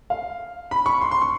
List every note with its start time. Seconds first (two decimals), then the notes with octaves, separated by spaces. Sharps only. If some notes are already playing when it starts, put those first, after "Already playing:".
0.10 F5
0.71 B5
0.86 C#6
1.01 C6
1.11 C6
1.22 C#6